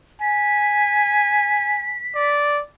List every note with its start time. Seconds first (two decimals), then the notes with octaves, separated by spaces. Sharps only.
0.21 G#5 B6
2.15 D5